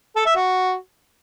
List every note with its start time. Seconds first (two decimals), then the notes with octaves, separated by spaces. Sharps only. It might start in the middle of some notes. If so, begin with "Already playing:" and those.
0.16 A4
0.26 E5
0.36 F#4